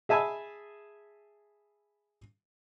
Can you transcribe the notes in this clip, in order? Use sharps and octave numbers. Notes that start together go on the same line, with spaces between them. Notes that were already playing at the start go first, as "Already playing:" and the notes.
G#4 E5 G#5 A5 B5 E6